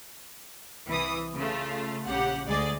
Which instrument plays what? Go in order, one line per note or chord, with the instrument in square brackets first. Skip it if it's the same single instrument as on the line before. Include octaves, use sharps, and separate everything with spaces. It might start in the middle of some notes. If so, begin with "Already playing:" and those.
[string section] C2 E3 E4 D#6
C#3 A3 F4
A#1 C#3 G4 F#5
D2 G#3 G#4 D5 D#5 A6